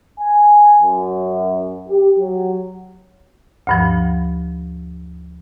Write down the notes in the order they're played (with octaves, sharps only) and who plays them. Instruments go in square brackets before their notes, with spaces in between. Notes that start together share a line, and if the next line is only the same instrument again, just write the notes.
[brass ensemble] G#5
F#2
G4
F#3
[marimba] D2 G2 F3